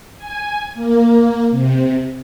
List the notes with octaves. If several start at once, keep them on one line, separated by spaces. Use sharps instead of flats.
G#5
A#3
C3